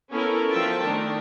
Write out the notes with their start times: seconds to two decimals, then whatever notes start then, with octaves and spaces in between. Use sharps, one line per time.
0.12 B3 C#4 E4 A4 A#4
0.51 D3 F3 F4 E5 G5 A5
0.84 D#3 A3 D4 A#4